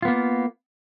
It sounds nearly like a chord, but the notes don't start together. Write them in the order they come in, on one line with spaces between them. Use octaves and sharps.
F4 B3 A#3